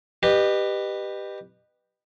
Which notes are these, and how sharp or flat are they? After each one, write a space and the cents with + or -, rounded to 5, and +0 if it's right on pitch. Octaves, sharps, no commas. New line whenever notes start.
G4 +0 B4 +0 D#5 -30